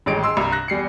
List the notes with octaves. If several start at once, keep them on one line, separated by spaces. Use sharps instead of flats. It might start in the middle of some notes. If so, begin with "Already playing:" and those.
D#1 A1 G#3 D7
G#4 D#5 C6 E6
C2 G2 A#5
F#6 A#6
E2 G3 C7 C#7